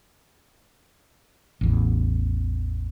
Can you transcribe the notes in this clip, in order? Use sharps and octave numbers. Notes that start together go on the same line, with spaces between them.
A1 E2